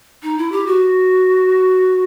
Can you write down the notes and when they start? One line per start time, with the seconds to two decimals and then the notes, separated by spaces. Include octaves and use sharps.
0.23 D#4
0.38 E4
0.52 G4
0.66 F#4